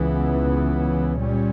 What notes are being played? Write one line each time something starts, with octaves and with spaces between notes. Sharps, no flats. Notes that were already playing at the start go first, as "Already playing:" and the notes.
Already playing: C#2 C#3 E3 B3
A#2 G3 C#4